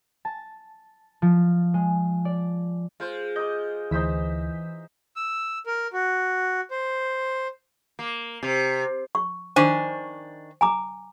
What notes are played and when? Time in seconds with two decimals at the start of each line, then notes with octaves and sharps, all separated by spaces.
0.25 A5
1.22 F3
1.74 G#3
2.25 D5
3.00 G#3 F4 C5
3.36 D#5 D6 G6
3.91 D2 E3 D#4 C5 E5 B6
5.16 E6
5.67 A#4
5.93 F#4
6.71 C5
7.99 A#3
8.43 C3
9.15 C#6
9.56 D#3 D4 C5 G#5 C#6
10.61 G#5 A#5 D6